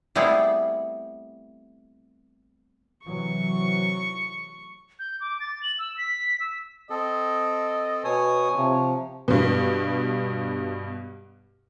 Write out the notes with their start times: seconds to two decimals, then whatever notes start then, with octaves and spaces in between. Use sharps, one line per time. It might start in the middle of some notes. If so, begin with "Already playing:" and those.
0.15 G3 A3 B3 C4 E4 G#4
3.06 C3 E3 F#3 C#6
4.99 G6
5.21 D6
5.40 A6
5.63 F#7
5.79 E6
5.98 B6
6.40 E6
6.90 C4 A4 D#5
8.05 B2 B4 C#5 G#5 D#6
8.55 C3 F3
9.28 G2 B2